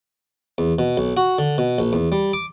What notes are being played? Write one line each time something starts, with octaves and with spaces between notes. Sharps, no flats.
E2
B2
B1
F#4
D3
B2
A#1
E2
G3
D6